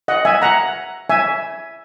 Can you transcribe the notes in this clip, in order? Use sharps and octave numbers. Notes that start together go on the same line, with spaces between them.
D#5 F#5
E5 G#5
F#5 A#5
E5 G#5